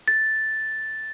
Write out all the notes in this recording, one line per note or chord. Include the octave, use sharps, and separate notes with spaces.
A6